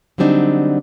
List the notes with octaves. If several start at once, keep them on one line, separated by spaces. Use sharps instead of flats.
D3 F#3 G3 C4 D4 D#4